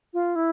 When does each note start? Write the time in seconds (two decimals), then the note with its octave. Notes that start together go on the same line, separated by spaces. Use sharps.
0.14 F4
0.36 E4